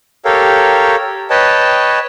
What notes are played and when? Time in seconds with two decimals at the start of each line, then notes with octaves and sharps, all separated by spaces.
0.25 G4 A4 A#4 C#5 F5 G5
1.30 B4 C#5 D#5 G5 A5